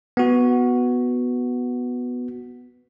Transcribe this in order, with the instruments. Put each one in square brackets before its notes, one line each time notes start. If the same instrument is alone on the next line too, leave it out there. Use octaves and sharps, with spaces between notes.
[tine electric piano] B3 F#4